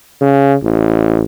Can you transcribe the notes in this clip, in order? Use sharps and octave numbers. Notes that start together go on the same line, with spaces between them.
C#3
A1